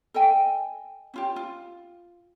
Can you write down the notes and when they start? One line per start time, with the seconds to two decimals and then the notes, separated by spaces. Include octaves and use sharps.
0.14 A4 D#5 G5 G#5
1.14 C#4 F4 G4
1.36 F4